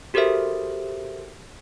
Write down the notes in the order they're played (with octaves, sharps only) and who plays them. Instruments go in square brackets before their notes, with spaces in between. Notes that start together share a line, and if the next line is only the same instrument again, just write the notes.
[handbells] F#4 G4 A4 A#4 C5 E5